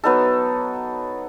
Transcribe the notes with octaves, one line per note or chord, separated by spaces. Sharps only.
F#3 B3 D#4 A4